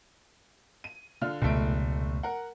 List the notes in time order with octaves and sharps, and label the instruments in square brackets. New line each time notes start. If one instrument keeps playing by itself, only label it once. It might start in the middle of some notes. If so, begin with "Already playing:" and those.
[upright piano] D#7
D3 F4 F6
[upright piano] F1 A3 D7 [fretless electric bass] C#2 B2
[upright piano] A#4 F#5